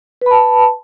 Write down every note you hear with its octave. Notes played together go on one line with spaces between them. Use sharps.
B4 A5 B5